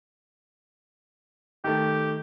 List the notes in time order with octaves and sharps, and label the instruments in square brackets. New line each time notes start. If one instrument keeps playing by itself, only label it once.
[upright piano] D#3 A3 [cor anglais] G4